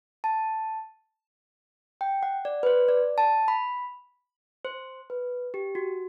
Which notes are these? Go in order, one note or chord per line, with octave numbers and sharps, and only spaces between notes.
A5
G5
F#5
D5
B4
C5
D5
A5
B5
C5
B4
G4
F#4